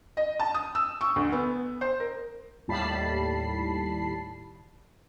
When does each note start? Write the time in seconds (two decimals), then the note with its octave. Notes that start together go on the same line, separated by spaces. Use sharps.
0.17 D#5
0.40 A5
0.54 D#6
0.75 E6
1.01 C#6
1.16 D2
1.32 B3
1.81 C5
2.00 A#4
2.68 D#2 A2 G3 A5 B5 C7